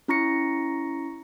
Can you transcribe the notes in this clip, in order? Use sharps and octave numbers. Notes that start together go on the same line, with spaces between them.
C#4 E4 A#5 C#6 A#6 C#7